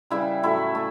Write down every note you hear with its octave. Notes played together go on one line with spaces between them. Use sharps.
C#3 E3 G3 E4
A2 F#3 A3 E4
A3